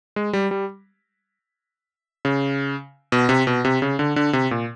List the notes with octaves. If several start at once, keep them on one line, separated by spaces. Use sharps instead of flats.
G#3
G3
G3
C#3
B2
C3
B2
C3
C#3
D3
D3
C3
A#2